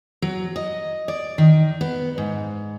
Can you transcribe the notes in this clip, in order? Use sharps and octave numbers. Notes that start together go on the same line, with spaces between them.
F#3
D#5
D5
D#3
B3
G#2